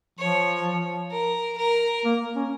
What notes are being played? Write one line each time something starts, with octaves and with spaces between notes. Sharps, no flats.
F3 C#5
A#4
A#4
A#3
C#4